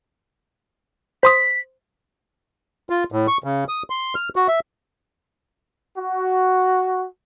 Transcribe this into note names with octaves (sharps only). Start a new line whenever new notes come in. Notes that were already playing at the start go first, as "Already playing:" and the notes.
C5 C6 D#6 B6
F4
A2
C#6
C#3
D#6
C6
F6
F#4
E5
F#4